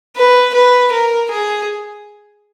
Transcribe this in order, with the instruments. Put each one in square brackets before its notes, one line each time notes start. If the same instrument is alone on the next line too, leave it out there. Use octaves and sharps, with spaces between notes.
[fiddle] B4
B4
A#4
G#4